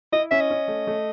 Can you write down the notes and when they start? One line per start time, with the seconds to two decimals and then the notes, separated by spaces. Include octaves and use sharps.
0.12 E4 D#5
0.31 C#4 E5
0.40 D#5
0.50 C#4
0.68 A3
0.87 A3